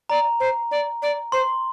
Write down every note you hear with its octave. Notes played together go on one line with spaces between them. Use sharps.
D5 A#5
C5
D5
D5
C5 C6